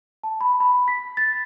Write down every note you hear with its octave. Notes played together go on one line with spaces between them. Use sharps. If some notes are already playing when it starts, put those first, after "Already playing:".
A5
B5
B5
B6
A6